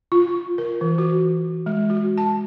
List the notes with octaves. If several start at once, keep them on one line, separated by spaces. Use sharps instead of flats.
F4
A#4
E3
F#4
G#3
F#4
A5